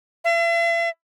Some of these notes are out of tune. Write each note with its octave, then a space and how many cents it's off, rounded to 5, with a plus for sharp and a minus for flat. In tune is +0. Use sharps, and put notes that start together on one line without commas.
E5 +45